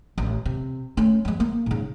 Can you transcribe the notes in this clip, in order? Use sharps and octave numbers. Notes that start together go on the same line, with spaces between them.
A1
C3
A3 C#4
F3 G#3
A#3
G#2 C#3